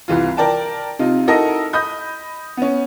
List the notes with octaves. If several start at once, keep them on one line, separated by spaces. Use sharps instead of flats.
C2 E3 F4
A#4 D5 G5 A5
C3 D#4 F4
D#4 E4 F#4 A4 A#4 D#5
D#5 B5 D#6 G6
B3 C#4